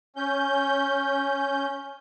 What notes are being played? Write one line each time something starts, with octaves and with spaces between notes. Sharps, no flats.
C#4 G6